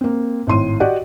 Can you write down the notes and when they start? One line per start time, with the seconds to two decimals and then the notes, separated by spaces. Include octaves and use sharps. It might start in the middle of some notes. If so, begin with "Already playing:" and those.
0.01 A#3 C4
0.47 G#1 A2 C6 D#7
0.80 F#4 G4 D5 D#5 F#5